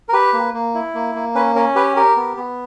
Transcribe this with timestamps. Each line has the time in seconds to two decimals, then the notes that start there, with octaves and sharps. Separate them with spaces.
0.09 A#4
0.13 G4 B4
0.33 A#3
0.54 A#3
0.74 E4
0.94 A#3
1.15 A#3
1.35 C#4 B4
1.56 C#4 A#4
1.76 G4 B4
1.96 G4 A#4
2.16 B3
2.37 B3